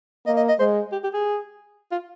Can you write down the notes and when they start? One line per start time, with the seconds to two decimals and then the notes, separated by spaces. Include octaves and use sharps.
0.26 A#3 D#5
0.37 D#5
0.48 D#5
0.59 G#3 C5
0.92 G4
1.03 G4
1.13 G#4
1.91 F4